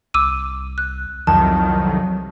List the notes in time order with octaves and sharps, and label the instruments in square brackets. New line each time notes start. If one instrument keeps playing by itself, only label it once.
[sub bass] C2 [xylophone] D6 E6 D#7
[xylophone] F#6
[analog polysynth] C2 F2 D#3 [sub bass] F#3 [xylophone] A5